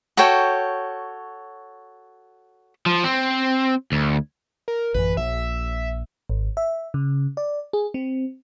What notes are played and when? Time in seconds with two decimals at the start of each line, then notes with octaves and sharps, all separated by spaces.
0.17 F#4 A4 C#5 G5
2.86 F3
3.04 C4
3.92 D2
4.68 A#4
4.94 A1 F#2 E3 B4
5.17 A#1 E5
6.30 G#1
6.57 E5
6.94 C#3
7.37 D5
7.73 G#4
7.94 C4